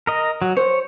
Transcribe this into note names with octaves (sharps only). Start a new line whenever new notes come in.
A#4 D#5
F#3
C5 C#5